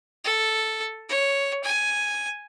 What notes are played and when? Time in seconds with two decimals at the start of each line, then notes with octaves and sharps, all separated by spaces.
0.25 A4
1.09 C#5
1.64 G#5